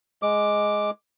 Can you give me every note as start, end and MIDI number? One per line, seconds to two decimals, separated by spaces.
0.22 0.90 56
0.22 0.90 86